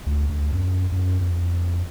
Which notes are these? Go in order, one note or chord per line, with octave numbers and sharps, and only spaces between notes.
D2
D2
F#2
F#2
F2